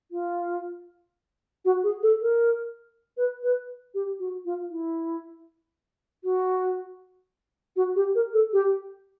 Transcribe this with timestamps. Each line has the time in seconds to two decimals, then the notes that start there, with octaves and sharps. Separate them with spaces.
0.11 F4
1.65 F#4
1.83 G#4
2.03 A4
2.21 A#4
3.17 B4
3.43 B4
3.94 G4
4.19 F#4
4.45 F4
4.70 E4
6.24 F#4
7.76 F#4
7.96 G4
8.15 A#4
8.33 A4
8.53 G4